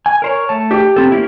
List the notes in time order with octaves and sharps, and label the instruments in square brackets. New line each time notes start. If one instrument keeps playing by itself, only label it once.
[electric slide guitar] G#5
A#4 C5 C#5
A3 A5
[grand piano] G4
[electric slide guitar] B3 C4 A4
A#3 C#4 E4